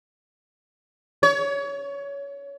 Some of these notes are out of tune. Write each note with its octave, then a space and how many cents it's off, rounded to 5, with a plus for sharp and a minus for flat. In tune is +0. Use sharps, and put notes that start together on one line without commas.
C#5 +20